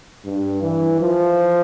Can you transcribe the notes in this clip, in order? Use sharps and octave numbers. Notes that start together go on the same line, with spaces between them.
G2
E3
F3